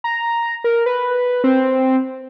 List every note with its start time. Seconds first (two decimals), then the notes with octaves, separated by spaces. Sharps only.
0.04 A#5
0.64 A#4
0.86 B4
1.44 C4